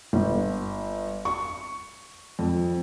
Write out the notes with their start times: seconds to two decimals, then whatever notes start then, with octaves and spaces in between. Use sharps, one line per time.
0.13 G1
1.25 C#6
2.39 F2